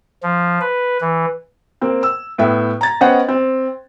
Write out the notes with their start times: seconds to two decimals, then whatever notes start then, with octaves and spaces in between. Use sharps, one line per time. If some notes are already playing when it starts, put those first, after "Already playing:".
0.23 F3
0.61 B4
1.01 E3
1.81 A#3 C4
2.03 E6
2.38 A2 B3 E5 G5
2.81 A#5 A6
3.01 B3 C#4 C5 D#5 F#5 G5
3.29 C4